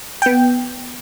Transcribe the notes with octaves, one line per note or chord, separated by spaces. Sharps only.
B3 G5